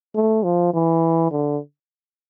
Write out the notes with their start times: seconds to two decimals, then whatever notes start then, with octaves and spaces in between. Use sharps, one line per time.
0.15 A3
0.44 F3
0.74 E3
1.31 D3